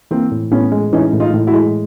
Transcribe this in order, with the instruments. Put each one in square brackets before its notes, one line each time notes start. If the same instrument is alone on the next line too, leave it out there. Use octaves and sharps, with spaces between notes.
[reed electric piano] E3 [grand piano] A#3 C4
[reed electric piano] A2
[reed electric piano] A2 [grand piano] B3 C#4
[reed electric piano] G#3
[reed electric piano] E3 [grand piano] C#4 D#4
[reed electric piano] A2
[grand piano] D#4 F4
[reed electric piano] A2
[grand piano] E4 F#4
[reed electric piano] G#3